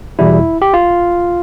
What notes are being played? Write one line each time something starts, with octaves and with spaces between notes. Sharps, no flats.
E2 B2 G3 E4
G4
F4